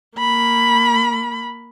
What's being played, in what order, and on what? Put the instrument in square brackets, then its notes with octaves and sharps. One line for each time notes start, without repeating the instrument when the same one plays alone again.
[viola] A#3 B5